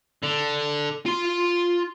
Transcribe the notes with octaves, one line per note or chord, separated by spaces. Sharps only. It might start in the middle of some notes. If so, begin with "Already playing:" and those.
D3
F4 C6